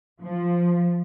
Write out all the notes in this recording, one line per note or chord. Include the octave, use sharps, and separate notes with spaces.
F3